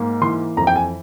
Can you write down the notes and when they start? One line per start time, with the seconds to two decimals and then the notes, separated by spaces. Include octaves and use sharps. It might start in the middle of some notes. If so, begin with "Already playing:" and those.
Already playing: G#2 A#3
0.21 E3 C6
0.57 F2 A#5
0.67 G5
0.76 G#5